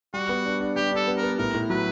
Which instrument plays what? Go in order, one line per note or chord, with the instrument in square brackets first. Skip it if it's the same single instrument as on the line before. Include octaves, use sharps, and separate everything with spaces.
[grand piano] G3 [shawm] F#4
[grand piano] B3
D4
D4
[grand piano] G3 [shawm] G4
[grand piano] D4 [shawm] A4
[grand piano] B3
[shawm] A#4
[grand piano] B3
[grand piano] A2 [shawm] A#4
[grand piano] A2
[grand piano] F#3 [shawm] B4